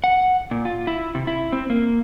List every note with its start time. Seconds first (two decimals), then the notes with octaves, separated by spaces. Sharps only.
0.04 F#5
0.51 A#2
0.65 F4
0.87 E4
1.15 C3
1.27 E4
1.52 C4
1.70 A#3